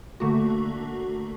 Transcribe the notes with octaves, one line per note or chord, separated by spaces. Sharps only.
D3 A3 A#3 F#4